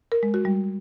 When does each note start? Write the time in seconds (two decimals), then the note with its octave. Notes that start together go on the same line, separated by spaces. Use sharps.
0.12 A#4
0.23 G#3
0.34 F#4
0.45 G3